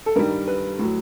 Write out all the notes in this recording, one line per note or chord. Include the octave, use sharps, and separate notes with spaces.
A4
G2 D#3 G3 A#4
B4
A2 F#3